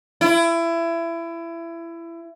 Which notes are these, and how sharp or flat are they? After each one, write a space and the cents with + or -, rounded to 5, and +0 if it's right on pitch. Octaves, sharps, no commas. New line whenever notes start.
E4 +25